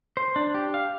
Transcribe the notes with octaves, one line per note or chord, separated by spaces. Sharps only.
C5
D4
G4
F5